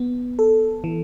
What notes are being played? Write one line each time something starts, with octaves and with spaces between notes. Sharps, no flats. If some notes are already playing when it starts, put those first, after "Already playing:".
Already playing: B3
A4
E3